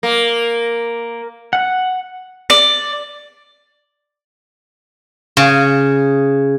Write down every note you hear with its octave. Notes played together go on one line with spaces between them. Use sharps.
A#3
F#5
D5
C#3